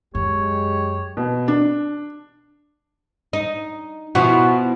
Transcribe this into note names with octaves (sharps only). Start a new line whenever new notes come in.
F#2 G#3 G4 C#5
B2
D4
D#4
B2 F3 E4 F#4